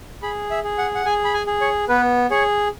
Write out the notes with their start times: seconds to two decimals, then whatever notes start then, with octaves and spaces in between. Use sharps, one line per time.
0.22 G#4 B5
0.51 E5
0.64 G#4
0.78 F#5
0.95 F#5
1.06 G#4 G#5
1.25 B5
1.34 G#5
1.47 G#4
1.61 C#5
1.89 B3 B4
2.30 G#4 C#5